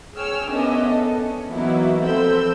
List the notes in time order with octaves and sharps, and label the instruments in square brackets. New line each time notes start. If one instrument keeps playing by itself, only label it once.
[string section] G#4 C#5 G5 G#5 E6 F6
B3 C#4 D4 A#4 D#5 E5
A4
C#4
E3 F#3 A#3 B3 D#4 E4
F3 C4 A4 B5 E6 G6